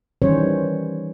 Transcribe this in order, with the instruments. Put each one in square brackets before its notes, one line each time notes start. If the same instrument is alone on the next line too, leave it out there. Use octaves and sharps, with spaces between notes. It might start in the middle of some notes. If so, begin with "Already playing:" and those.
[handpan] D#3 E3 G3 C#4 C5 C#5